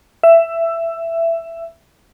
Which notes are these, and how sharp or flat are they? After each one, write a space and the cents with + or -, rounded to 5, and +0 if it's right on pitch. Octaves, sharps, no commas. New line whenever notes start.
E5 +15